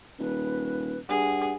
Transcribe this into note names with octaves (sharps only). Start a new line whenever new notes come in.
D#1 B4
G2 G#4 F#5